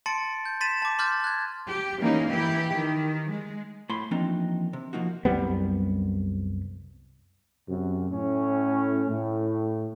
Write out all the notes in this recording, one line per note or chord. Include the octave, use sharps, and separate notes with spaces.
A5 C6 A6 C#7 D7
G6
C6 A6 B6 D#7 E7
A5 D6
C6 D6 F6 G6 A6
F#6 G#6
G4
E3 A#3 C#4 D#4
E3 E4 G4
D#3
G#3
A2 B5 C6
E3 F3 A#3 C4 D4 D#4
C3
F3 A#3 D#4 F#4
C2 F#2 G3 B3
F#2 C3
A2 C#4
A2